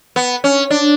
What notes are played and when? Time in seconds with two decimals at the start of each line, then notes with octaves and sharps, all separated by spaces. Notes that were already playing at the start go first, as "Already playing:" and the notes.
0.16 B3
0.44 C#4
0.70 D4